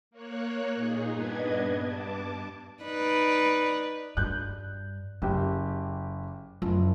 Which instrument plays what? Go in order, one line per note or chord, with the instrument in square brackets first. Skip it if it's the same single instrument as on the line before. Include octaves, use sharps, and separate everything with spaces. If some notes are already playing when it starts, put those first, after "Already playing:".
[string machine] A#3 C#5 F#6
A#2 D#4 G#4
G2 B3 D4 B4 D#5 G#6
G2 A5 D6
[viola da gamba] D#4 B4 D5
[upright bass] G2 [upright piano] F#6 G6
[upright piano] F#1 G4 [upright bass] C#3
[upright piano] F#1 F3 [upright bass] F#2